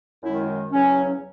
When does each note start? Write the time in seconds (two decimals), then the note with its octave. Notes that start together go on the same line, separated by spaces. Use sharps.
0.23 F#2 D#3 G#3 E4
0.72 E2 C#3 F#3 C#4